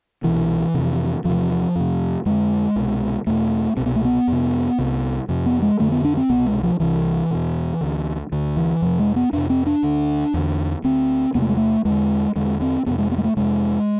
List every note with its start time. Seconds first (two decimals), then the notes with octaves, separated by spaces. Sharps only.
0.23 C2 B2 E3
0.74 F2 C3
1.25 E2 C3 F3
1.76 F2 C3
2.26 F2 D3 G#3
2.76 C2 B2
3.27 E2 B2 A3
3.77 C2 B2 C4
3.86 B3
3.96 A3
4.05 B3
4.27 F2 C3
4.78 C2 C3
5.29 F2 C3
5.46 B3
5.62 G#3
5.79 F2 D3 A3
5.92 B3
6.04 D4
6.17 C4
6.29 C2 B2 B3
6.46 G#3
6.63 F3
6.80 C2 C3 E3
7.31 E2 B2
7.81 D2 D3
8.32 D2 D3
8.57 E3
8.82 F2 C3 F3
8.99 G#3
9.16 B3
9.33 F2 C3 D4
9.50 C4
9.67 D4
9.83 D2 D3
10.34 E2 D3
10.84 D2 D3 C4
11.35 E2 C3 B3
11.42 A3
11.49 G#3
11.57 A3
11.85 E2 D3 G#3
12.36 E2 D3 G#3
12.61 C4
12.86 F2 C3 B3
12.99 G#3
13.11 B3
13.18 G#3
13.24 A3
13.37 F2 C3 G#3